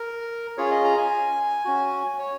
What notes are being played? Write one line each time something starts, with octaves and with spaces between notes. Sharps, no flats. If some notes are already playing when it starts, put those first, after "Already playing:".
Already playing: A#4
C#4 F4 G#4 C#5
D#5
A#5
G#5
C#4 F#4
C#5